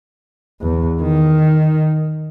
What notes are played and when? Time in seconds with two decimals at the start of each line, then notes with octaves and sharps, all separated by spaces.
0.62 E2
1.02 D#3